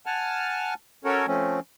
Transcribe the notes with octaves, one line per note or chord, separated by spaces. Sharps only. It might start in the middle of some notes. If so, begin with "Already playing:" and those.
F#5 G#5 A5 F6
C#4 F#4 A4 A#4 C#5
F3 A3 C4 C#4